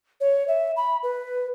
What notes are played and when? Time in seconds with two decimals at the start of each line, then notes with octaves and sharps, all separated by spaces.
0.21 C#5
0.48 E5
0.76 B5
1.03 B4